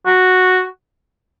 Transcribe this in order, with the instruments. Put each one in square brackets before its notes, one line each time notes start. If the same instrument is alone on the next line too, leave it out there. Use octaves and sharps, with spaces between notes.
[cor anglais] F#4